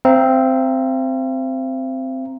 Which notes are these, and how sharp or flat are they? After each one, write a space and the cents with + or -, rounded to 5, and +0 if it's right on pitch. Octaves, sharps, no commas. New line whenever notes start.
C4 -5 F5 -45 A#5 +0